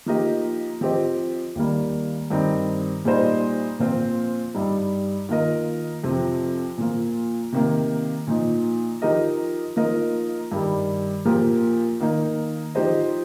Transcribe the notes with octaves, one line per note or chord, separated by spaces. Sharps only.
F3 A#3 D#4 G4 D#5
F3 C4 G4 C5 D#5
D#2 D#3 G3 A#3
G2 D#3 C4 D#4
A#2 G3 D#4 C5 D#5
A#2 F3 C4 F4 C5
G2 G3 D#4
D#3 A#3 F4 A#4 D#5
F2 C3 F3 C4
A#2 F3 A#3
C3 D#3 A#3
A#2 F3 D#4
F3 D#4 G4 A#4 D#5
F3 A#3 D#4 A#4 D#5
G2 D#3 G3
A#2 F3 A#3 G4 A#4
D#3 A#3 D#4
F3 D#4 G4 C5 D#5